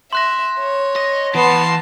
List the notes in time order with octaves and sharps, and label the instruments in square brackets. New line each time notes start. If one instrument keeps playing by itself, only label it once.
[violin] E5 [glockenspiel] C6 F#6 A#6
[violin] C#5
[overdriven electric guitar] D#5 [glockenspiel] A#6
[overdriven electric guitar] E3 C6 [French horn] B3 [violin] A5 C7